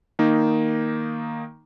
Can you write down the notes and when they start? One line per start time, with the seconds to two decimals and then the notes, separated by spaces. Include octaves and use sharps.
0.19 D#3 A#3 D#4